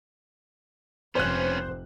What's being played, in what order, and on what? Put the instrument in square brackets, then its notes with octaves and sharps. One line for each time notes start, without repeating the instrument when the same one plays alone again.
[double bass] F1 [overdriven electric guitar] B3 C#4 [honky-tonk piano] C5 F#6